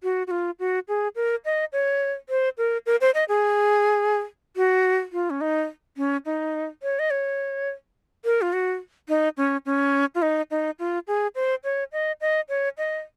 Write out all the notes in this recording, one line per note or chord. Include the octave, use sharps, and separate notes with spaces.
F#4
F#4
F4
F#4
G#4
A#4
D#5
C#5
C5
A#4
A#4
C5
D#5
G#4
F#4
F4
C#4
D#4
C#4
D#4
C#5
D#5
C#5
A#4
F4
F#4
D#4
C#4
C#4
F4
D#4
D#4
F4
G#4
C5
C#5
D#5
D#5
C#5
D#5